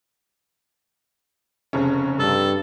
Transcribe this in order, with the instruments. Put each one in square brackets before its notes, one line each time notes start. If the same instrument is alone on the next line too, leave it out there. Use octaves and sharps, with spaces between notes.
[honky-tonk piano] F1 C#3 C#4
[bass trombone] G2 [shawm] A4